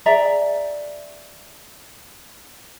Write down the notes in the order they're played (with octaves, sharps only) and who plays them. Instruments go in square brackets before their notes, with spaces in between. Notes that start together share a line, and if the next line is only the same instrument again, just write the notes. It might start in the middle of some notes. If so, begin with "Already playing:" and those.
[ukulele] G#4 D5 E5 A#5